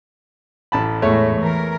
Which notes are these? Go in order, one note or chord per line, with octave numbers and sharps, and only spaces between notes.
A1 A5 B5
E2 A2 G#3 A3 C#5
E3 A#4